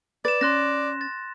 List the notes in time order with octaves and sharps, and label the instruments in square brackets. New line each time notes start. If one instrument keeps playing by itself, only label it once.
[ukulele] B4 [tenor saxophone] D5 [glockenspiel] A6 E7
[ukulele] C#4 [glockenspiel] C6 F#6 A#6
[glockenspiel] A6